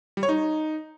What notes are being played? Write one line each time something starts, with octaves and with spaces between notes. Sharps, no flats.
G3
C#5
D#4